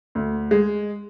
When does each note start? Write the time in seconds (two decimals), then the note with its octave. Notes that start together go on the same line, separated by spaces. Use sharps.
0.15 D2
0.51 G#3